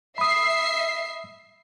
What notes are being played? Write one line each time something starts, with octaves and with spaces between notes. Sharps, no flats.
E5 B5 D#6 C7